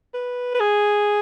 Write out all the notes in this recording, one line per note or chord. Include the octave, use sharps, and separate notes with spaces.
B4
B4
G#4